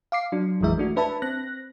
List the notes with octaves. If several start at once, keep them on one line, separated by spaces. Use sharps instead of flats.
F5 D6 C7
F#3 D4
A1 F2 E3 G#3 E5
A3 D4 F#4
D4 B4 E5 A5 B5
C4 F#6 A#6